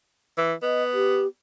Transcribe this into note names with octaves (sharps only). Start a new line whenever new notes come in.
E3
B3 D#5
G4